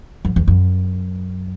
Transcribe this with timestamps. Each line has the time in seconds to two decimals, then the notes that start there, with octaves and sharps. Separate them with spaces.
0.25 F#2
0.36 E2
0.48 F#2